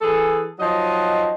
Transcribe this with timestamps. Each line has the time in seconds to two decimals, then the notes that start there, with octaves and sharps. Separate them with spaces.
0.02 E3 G#4 A4
0.59 F3 F#3 D#4 D#5